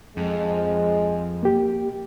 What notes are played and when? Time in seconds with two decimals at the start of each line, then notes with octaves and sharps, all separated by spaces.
0.17 F2 G#3
1.43 A#3 G4